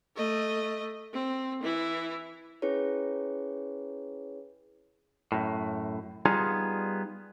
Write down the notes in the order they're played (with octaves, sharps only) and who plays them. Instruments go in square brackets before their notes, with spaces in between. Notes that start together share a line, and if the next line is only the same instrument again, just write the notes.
[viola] A3 D#5
C4
E3 E4
[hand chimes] C#4 E4 G#4 B4 C#5
[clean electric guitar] F#2 A2
G3 B3 D#4 F4 G#4